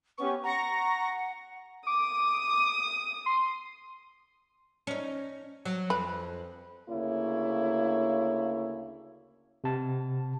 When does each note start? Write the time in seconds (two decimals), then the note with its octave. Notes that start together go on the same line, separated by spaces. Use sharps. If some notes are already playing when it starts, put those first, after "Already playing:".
0.18 B3 C#4 G4 C#6
0.43 F#5 A#5 C#6 A#6
1.87 D6 D#6
3.26 C6
4.87 C#4 D#4
5.65 F#3
5.90 F2 B4
6.90 D2 C#3 A#3 E4 C#5
9.64 C3 A5